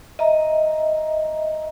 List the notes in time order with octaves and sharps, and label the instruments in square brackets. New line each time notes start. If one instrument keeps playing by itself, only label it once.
[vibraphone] D#5 E5 A#5